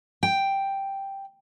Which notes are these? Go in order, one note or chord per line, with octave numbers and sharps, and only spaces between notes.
G5